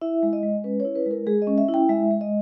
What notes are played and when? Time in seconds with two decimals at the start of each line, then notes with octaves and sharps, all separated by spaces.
0.01 E4 E5
0.23 G#3
0.33 D#5
0.43 G#3
0.64 C#4 B4
0.80 C#5
0.85 E4
0.95 B4
1.06 G#3 A#4
1.27 G#3 G#4
1.42 D#5
1.47 C#4
1.58 E5
1.68 E4
1.74 G5
1.89 G#3 E5
2.11 G#3
2.21 D#5